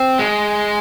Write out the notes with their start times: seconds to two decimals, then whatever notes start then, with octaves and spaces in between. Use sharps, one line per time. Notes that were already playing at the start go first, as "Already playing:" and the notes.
Already playing: C4
0.19 G#3